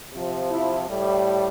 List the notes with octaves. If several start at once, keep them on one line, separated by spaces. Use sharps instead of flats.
C3 F3
E4
A2 G3